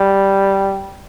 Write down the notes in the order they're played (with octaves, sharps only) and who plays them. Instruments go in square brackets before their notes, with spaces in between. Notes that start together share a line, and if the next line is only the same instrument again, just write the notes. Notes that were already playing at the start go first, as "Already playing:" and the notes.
Already playing: [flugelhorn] G3